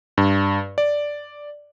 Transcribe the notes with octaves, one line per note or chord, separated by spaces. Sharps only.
G2
D5